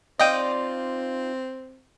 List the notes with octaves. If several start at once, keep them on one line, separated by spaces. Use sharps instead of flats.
C4 D#4 F4 D5 D#5 G5 D#6